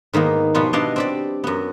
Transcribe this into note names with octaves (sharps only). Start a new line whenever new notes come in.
G#2 D#3 A#3 B3
B2 F3 G3 B3 F4
B3 D4 E4 D5 D#5 F5
C4 G4 D5
F#2 B3